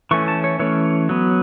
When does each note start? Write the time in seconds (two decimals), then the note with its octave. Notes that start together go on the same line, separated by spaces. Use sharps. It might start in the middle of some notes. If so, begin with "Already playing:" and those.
0.11 E3 A3 C#4 C#6
0.28 A5
0.44 C#5
0.59 E3 A3 C#4 C#5
1.09 F#3 B3